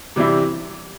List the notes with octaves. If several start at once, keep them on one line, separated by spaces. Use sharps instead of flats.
C3 E3 G3 C4 E4